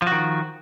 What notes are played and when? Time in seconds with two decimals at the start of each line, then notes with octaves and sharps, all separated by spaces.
0.02 F3
0.07 F#4
0.12 D#3